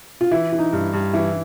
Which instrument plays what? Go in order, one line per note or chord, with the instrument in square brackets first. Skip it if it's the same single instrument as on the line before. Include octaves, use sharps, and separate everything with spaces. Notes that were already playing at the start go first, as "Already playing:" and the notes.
[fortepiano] F4
[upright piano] E3 [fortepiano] E4
[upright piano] E3
[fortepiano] D#4
[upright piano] G2
G2
[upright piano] E3 [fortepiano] E4